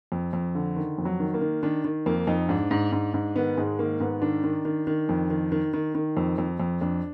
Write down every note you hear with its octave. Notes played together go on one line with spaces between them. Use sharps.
F2
F2
D3
D#3
F2
F#3
D#3
A#3
D#3
D#3 D4
D#3
F2 A#3
F2 D#4
G#2 D4
G#2
G#2
G#2
D#3 B3
G#2 G#3
D#3 A#3
G#2 B3
D#3 D4
D#3
D#3
D#3
F2
D#3
D#3
D#3
D#3
F2
F2
F2
F2 D4